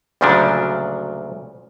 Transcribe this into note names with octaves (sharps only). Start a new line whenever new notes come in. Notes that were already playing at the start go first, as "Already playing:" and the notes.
D2 A#2 C#3 F3 F#3 D4